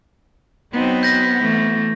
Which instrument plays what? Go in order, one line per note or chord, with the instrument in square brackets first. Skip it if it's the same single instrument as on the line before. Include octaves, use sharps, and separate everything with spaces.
[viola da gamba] F#3 C4 D#4 [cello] B3
[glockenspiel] G6 A#6
[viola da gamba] E3 A3